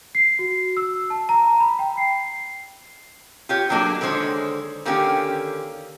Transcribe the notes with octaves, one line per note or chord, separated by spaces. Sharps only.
C7
F#4
E6
A5
A#5
B5
G5
C7
F4 G4 C#5
D3 F#3 G#3 A#3 D4
D3 D#3 G#3 C5 C#5
D3 D#3 A#3 C#4 G4